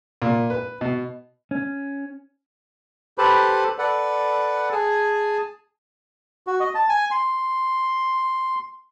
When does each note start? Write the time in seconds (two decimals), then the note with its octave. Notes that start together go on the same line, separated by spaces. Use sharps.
0.22 A#2
0.50 B4
0.81 B2
1.51 C#4
3.18 G4 A4 B4 C5 A5 B5
3.79 A4 B4 D5 F#5
4.71 G#4 G#5 A5
6.47 F#4
6.60 D#5
6.75 A5
6.89 G#5
7.11 C6